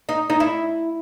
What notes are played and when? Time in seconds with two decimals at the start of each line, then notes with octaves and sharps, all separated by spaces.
0.09 D#4
0.30 D#4
0.40 E4